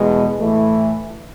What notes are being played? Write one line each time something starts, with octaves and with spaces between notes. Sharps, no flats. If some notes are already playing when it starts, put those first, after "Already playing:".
Already playing: E2 B2 G#3
A2 E3 A3